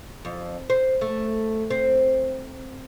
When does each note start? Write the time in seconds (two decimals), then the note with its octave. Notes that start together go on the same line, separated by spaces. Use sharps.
0.25 F2
0.70 C5
1.01 A3
1.70 C4